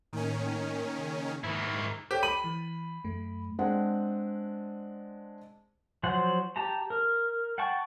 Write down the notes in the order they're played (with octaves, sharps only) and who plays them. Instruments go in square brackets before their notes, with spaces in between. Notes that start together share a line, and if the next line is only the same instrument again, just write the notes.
[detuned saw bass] A2 [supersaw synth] D#3 C#4 [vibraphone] A#3
[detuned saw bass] C#3
[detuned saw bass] G#2 [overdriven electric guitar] D#3 E4
[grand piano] G4 [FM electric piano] A4 C5 C#5
[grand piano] B5 D#7 F#7
[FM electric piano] E3
F#2 A3
[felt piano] G#3 C4 D4 F#5
[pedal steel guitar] F3 F#3 C5 F#5
G4 A5 A#5
A#4
F#5 G5 A5 C#6